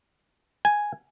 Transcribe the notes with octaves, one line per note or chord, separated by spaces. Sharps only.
G#5